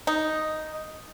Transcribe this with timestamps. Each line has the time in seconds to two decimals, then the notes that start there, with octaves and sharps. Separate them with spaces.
0.07 D#4